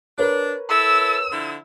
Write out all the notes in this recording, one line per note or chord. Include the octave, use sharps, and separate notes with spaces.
D4 A#4 B4 C#5
E4 A4 E6
D3 F3 E4